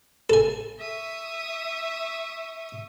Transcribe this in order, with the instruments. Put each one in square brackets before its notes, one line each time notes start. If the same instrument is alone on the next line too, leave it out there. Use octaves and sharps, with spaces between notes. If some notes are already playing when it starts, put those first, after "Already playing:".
[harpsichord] A4 G#5
[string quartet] E5 C#6 D#6